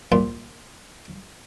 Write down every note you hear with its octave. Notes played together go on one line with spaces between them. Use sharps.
C2 A#2 C6